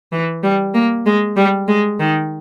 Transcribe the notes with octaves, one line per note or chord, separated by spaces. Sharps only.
E3
G3
A#3
G#3
G3
G#3
D#3